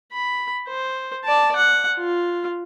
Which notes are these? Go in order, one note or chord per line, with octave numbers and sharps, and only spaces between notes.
B5
C5
D5 A5
F#5
F4